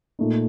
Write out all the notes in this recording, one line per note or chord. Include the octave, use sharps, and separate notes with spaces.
A#2 A3 D#4